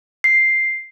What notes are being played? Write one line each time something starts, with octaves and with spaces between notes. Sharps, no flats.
C7